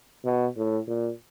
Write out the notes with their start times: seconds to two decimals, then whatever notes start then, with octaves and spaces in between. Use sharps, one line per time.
0.25 B2
0.57 A2
0.88 A#2